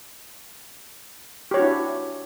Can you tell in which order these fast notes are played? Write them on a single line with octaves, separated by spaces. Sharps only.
G4 C#5 F#4 D4 E4